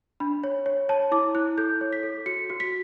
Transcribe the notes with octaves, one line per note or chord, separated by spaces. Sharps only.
D4 B5
C#5
C#5
C#5 A5
E4 D6
E4 F#6
A4 G6
C#5
B6
A4
F#4 C#7
F#4
B6